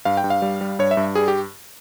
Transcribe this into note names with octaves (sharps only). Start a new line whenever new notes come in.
G2 F5
G5
G2
F5
G3
G3
G2 C#5
E5
G2
G3 G#4
G4